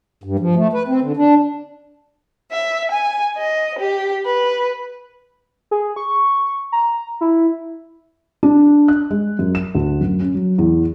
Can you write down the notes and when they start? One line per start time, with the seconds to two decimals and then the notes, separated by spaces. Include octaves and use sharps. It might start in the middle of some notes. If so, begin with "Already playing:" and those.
0.24 G2
0.39 F3
0.55 A3
0.73 B4
0.88 C4
1.01 D3
1.17 D4
2.51 E5
2.91 G#5
3.36 D#5
3.78 G4
4.24 B4
5.71 G#4
5.96 C#6
6.72 A#5
7.21 E4
8.43 D4
8.88 F#6
9.11 G#3
9.39 F#2
9.55 E7
9.75 D2
10.01 F#2
10.20 C#4
10.34 F#3
10.58 E2